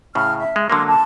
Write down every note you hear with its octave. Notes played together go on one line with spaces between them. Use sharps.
A2 C#3 F6
E5
G#3
D3 F#3 A#3 C6
A5